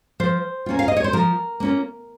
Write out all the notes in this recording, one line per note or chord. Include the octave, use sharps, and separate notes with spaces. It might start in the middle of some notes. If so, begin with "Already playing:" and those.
F3 C5
A#3 C#4 F4
F5
D#5
C#5
C5
F3 A#4
A#3 C#4 F4